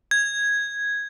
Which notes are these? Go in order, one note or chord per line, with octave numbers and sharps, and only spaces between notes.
G#6